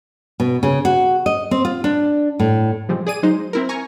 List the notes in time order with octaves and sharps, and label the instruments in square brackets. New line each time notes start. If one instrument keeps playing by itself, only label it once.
[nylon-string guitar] B2
C#3
F#4
D#5
C4
F4
D4
A2
[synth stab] C3 F3 G3 G#3 C4
G#4 D5 D#7
F#3 G#3 D#4 C5
C4 E4 A#4
G#5 A#5 C#6